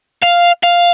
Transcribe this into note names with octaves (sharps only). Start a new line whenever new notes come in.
F5
F5